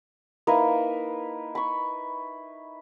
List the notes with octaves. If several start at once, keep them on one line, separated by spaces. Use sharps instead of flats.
A#3 D#4 E4 B4
B5 C#6